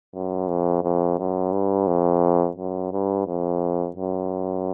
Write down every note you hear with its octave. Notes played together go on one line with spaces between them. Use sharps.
F#2
F2
F2
F#2
G2
F2
F#2
G2
F2
F#2